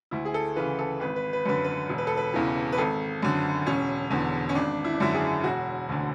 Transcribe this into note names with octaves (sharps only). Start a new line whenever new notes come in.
D2 E4
G#4
A4
C#3 E3 B4
A4
G#1 B4
B4
B4
F#2 D3 B4
B4
E1
B4
A4
B4
E2 C#3 E3
B4
G#1 A4
F#2 D3
E1 C#4
E2 D3
C#4
G#1 D4
E4
D4
F#2 D3 E4
G#4
E1 F#4
D2 D3